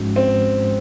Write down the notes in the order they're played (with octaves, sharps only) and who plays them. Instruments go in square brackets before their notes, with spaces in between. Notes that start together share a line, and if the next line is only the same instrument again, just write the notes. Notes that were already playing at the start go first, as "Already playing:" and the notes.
Already playing: [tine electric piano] G#2 F3 G#3 C#4 F#4
[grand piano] C4